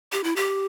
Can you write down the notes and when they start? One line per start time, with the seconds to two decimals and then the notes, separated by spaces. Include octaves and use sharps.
0.12 G4
0.24 E4
0.36 G4